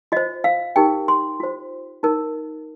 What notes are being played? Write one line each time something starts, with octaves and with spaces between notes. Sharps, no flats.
F4 C5 D#5
F5
D#4 G4 A#4 G5
C6
F4 C5
D#4 A#4